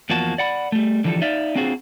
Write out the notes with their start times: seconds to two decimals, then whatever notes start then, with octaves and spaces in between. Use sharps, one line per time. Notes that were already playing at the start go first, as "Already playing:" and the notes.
0.10 E2 F3 A#3 F#4 A5
0.38 D5 F#5 B5
0.72 G3 A3
1.04 D3 E3 F3 G3 A4
1.22 D#4 D5 E5 F5
1.55 C4 D4 F4 F#4 G#4 C5